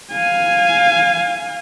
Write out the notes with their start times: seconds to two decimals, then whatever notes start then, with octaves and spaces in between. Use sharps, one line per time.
0.12 F5 G#5